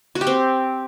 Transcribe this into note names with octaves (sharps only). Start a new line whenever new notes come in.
F#4
G4
C4